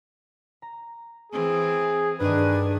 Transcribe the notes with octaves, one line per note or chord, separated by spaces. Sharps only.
A#5
E3 C4 G#4
G2 D#3 D4 G#4 B4